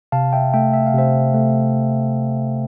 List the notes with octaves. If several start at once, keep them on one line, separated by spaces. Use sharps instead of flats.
C3 F5 A5
E5 G5
A3 E5 G5
E5
F5
C3 C5 E5
A3